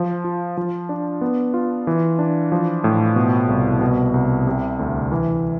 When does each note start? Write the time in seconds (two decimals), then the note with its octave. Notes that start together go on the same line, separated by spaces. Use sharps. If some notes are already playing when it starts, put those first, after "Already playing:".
Already playing: F3
0.24 F4
0.57 F3
0.89 D4
1.21 B3
1.54 F4
1.87 E3
2.19 D4
2.52 F3
2.84 A2
3.16 B2
3.49 C2
3.81 B2
4.14 C2
4.47 C3
4.79 D2
5.12 E3